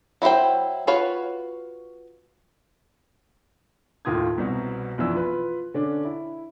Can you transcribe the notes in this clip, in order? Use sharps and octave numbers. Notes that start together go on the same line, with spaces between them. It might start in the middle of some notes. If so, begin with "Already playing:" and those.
F#3 E4 F#4 C5 G5
F4 F#4 B4 C#5 F5
D#2 A2 D#3 F4 D#6 G#6
C2 B2 F#3
A#1 F#2 B2 E3 E6
F4 B4
D3 C#4 D4
E4